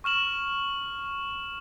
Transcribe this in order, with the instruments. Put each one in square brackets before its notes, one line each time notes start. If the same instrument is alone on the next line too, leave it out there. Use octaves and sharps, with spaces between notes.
[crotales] C#6 F6 E7 F#7